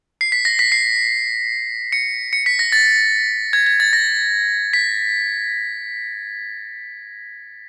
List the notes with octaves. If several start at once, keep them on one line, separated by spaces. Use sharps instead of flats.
C7
B6
A#6
B6
C7
C#7
C#7
B6
A#6
A6
G#6
G#6
A6
A#6
B6